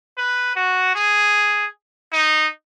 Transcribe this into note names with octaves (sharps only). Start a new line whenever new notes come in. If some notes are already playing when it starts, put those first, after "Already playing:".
B4
F#4
G#4
D#4